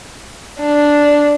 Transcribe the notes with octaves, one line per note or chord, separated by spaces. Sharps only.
D4